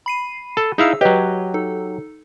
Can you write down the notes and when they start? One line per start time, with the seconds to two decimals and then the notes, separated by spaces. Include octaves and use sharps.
0.06 B5 C7 D#7
0.57 A4
0.78 D#4 E4 G#4 F5 E6
1.01 F#3 G4 B4 C#5 D#5
1.54 D#4 A4